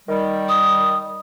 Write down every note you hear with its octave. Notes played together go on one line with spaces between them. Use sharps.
D#3 G3
D#6